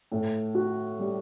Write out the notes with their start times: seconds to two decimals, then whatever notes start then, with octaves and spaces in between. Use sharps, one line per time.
0.12 A2
0.55 F#4
0.99 G3